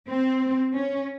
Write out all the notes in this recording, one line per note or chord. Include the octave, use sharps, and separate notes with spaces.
C4
C#4